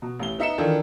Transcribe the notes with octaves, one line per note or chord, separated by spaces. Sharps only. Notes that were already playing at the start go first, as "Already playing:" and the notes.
B2
A1 G7
B3 D#4 E5 C#7 E7
D#3 E3 D4 F4 A4